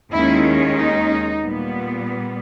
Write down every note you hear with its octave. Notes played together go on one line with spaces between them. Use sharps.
D#2 D#3 G#3 C#4 E4
D#4
A#2 G3 B3